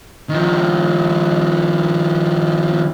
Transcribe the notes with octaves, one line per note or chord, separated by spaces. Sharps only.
D#3 F3